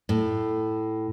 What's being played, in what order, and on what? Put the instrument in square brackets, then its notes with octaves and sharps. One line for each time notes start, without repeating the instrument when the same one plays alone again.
[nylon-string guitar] A2